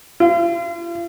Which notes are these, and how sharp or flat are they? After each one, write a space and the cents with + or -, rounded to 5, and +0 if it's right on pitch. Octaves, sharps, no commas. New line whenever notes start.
F4 -40